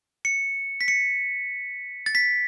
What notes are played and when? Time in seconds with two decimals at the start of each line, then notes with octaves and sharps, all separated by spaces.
0.25 C#7
0.81 B6
0.88 C#7
2.06 A6
2.15 B6